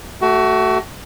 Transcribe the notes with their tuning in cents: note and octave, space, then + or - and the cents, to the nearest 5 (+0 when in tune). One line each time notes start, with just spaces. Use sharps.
A3 +0 F#4 +30